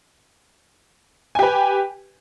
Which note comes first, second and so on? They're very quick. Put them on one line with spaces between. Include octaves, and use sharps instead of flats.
G#5 G4 B4